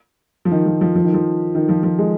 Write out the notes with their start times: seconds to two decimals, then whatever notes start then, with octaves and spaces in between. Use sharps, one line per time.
0.45 F3
0.51 D#3
0.66 F3
0.81 F3
0.95 F3
1.05 D#3
1.14 F3
1.55 D#3
1.69 F3
1.83 F3
1.99 G#3